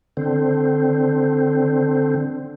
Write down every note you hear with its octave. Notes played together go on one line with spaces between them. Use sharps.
D3 C4